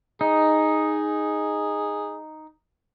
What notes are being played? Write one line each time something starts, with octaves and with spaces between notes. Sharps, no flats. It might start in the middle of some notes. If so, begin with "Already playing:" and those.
D#4 G#4